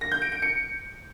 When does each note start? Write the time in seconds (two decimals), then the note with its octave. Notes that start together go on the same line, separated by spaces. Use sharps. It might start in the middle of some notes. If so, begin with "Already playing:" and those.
0.01 A#6
0.11 G6
0.22 D7
0.32 D7
0.42 C#7